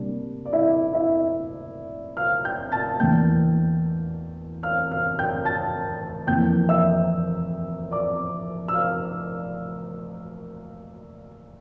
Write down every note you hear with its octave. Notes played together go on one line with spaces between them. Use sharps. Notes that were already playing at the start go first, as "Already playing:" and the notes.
Already playing: C3 G3 A#3 D4
D5
E4 E5
E4 E5
F5 F6
G5 G6
A5 A6
E2 E3 A#3 D4 G5 G6
F5 F6
F5 F6
G5 G6
A5 A6
F2 E3 A#3 G5 G6
E5 E6
D5 D6
E6
F5 F6